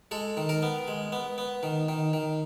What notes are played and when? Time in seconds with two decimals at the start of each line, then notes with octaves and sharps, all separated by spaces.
0.11 G#3 A4
0.37 D#3
0.49 A#4
0.62 B3
0.88 G#3
1.12 B3
1.38 B3
1.63 D#3
1.89 D#3
2.13 D#3